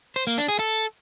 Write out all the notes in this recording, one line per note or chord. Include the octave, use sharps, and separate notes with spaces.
C5
A#3
D4
G#4
A4